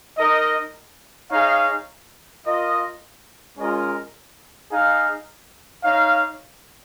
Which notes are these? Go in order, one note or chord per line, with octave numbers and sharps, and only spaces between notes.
D#4 A#4 D#5
D#4 G#4 C#5 F5
F4 A#4 D#5
G#3 C#4 F4 A#4 D#5
D#4 G#4 F5
D#4 C#5 F5